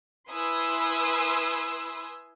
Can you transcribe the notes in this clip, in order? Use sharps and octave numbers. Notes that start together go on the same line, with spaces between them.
E4 B4 G#5 C6 D#6 E6